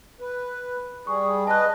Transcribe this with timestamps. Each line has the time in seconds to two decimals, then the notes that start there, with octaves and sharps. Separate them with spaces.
0.20 B4
1.07 G3 G#4 C#6
1.47 B4 D#5 A5 F#6